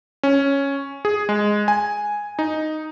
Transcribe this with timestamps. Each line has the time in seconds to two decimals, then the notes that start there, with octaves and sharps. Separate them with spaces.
0.23 C#4
1.05 G#4
1.29 G#3
1.68 G#5
2.39 D#4